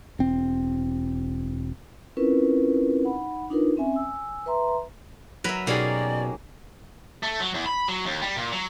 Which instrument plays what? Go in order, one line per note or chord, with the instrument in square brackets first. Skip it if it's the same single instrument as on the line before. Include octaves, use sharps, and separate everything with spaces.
[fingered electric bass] E1 C4
[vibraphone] C4 C#4 E4 F4 A#4 B4
D#4 F#5 B5
D4 D#4 F4 A#4 B4
C4 C#4 E5 G#5
G#5 E6
B4 E5 A#5 C6
[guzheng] F#3 B4 [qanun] A#4 E5
[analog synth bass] B2 [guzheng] A#3 C#4 [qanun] D#4 G4 G#4 [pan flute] D5
[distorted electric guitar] A3
F#3
E2
B5
F#3
D#2
G3
A#2
F#3